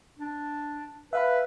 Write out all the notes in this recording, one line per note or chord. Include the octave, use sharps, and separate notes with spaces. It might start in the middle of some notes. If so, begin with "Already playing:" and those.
D4
B4 E5 F5 B5